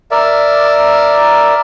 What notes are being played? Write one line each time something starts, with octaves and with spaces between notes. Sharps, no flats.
A#4 D5 E5